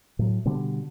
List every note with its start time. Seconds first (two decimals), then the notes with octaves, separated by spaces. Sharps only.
0.19 A2 F#3
0.45 B2 D3 G3